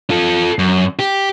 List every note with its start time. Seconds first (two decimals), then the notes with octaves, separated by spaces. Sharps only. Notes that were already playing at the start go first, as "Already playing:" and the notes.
0.10 F4 A4
0.59 F#2
0.99 G4